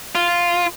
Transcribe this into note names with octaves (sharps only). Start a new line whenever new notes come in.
F4